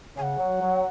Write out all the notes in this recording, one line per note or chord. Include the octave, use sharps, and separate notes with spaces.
C#3 G#5
F#5
F#3
F#3